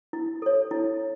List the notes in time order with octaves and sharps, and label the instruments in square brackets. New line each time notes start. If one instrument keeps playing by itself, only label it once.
[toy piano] E4
A4 C#5
E4